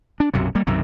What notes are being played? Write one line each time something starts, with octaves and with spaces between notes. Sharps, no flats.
D4
B1 F#2 C3 F#3
G3 A#3
B1 F#2 C3 D#3